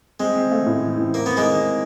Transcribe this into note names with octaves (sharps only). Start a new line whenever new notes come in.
G#3 C4
C4
A3
A2
E3
A2
A#3 C4
B3 C4
G#3 A#3
D#3
C4